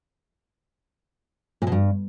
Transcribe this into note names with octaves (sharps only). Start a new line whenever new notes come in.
A#2
B2
G2